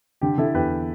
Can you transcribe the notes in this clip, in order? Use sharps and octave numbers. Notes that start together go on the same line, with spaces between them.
D3 G4
D3 E4 A4
E2 G4 B4